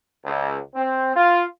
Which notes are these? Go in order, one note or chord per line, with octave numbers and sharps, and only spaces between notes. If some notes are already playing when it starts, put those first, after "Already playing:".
C#2
C4
F4